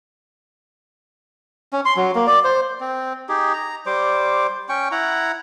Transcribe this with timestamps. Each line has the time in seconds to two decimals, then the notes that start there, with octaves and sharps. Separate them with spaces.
1.73 C#4
1.85 C6
1.96 F#3
2.15 A#3
2.27 D5
2.44 C5
2.80 C4
3.29 D#4 G4 G#4
3.53 A#5
3.86 G3 C5 D6
4.69 C#4 G5 C#6
4.92 E4 F#5 A#5